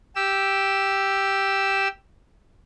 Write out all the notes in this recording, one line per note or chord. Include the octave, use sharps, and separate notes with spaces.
G4 E6